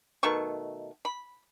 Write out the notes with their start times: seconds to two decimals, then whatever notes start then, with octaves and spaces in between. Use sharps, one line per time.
0.23 B2 D#3 A3 C#6
1.05 B5